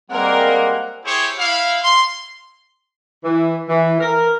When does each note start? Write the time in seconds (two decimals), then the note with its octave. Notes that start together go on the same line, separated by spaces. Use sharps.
0.10 G3 G#3 A#3 C4 A#4 F#5
1.05 E4 G4 G#4 C5 C#5
1.38 E4 F5
1.82 C6
3.24 E3
3.69 E3
4.00 A#4